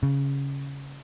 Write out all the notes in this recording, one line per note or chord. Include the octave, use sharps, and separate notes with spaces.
C#3